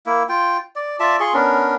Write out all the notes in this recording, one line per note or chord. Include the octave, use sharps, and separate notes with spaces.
A#3 E4
F4 G5
D5
F4 D5 E5 A5
F4 G#4 C6 C#6
B3 C#4 D4 A#4